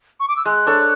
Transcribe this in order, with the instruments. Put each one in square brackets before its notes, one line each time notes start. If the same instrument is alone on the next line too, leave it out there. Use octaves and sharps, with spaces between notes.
[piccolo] C#6
D6
E6
[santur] G#3 [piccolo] F#6
[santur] D4 A4 C#5